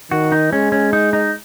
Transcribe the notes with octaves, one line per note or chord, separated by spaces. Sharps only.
D#3 F#4
D#4
G#3 C#4
C#4
D#4
D#4